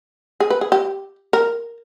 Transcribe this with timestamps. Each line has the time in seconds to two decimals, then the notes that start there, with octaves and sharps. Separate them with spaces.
0.40 G#4
0.50 B4
0.61 G#4
0.72 G4
1.33 A#4